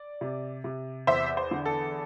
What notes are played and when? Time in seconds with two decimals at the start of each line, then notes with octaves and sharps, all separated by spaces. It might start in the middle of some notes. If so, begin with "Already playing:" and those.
Already playing: D5
0.21 C3
0.64 C3
1.07 E2 C5 E5
1.37 C5
1.51 D3
1.65 A4